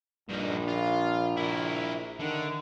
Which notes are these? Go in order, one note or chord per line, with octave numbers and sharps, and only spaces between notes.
A#1 G2 D#4
F4
E4 A#4
D3 D#3